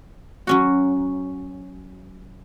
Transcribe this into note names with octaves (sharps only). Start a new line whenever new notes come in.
F#3 C#4 F#4